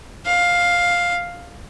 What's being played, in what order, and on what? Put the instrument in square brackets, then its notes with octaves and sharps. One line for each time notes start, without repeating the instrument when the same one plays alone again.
[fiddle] F5